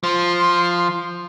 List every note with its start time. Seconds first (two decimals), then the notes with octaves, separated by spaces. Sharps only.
0.03 F3 C6